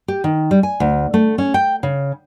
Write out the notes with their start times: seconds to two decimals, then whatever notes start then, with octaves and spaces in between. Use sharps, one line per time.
0.08 G4
0.24 D#3
0.51 G3
0.63 G#5
0.80 D2
1.14 A3
1.38 C#4
1.54 G5
1.83 C#3